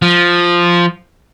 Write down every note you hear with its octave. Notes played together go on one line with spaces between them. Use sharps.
F3